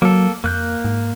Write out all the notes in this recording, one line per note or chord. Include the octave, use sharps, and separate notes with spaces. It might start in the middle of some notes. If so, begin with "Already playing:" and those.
F#3 A#3 A4
F2 A#3 F#6 G6
G#2